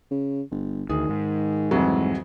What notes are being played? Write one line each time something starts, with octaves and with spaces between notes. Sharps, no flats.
C#3
G1
D2 D#3 G#4
G#2
C2 F2 E3 F#3